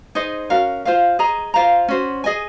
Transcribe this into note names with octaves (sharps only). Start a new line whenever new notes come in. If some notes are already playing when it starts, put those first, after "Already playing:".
D#4 G#4 C5 D#5
C#4 F#4 A#4 F5
F4 C5 F5
G#4 D#5 A#5
F4 C5 F5 A#5
C#4 F#4 C5
G#4 D#5 G#5